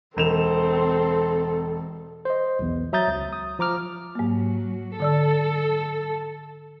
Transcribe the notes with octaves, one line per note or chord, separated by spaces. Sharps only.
E1 C4 A4 E7 F7
C5 D#5
B1 E2
F#3 E5 A#5 D#6 G6 A6
C#2
D#6
F3 A#5 D6 F6
G#2 F#3 A#3
D3 A4 D5 E6